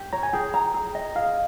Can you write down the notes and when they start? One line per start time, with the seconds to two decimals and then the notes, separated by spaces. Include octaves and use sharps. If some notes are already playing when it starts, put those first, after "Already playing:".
Already playing: G4
0.13 C#5 A#5
0.23 G#5
0.33 G#4 G5
0.54 A#5
0.74 G#4
0.95 D#5
1.15 G#4 F5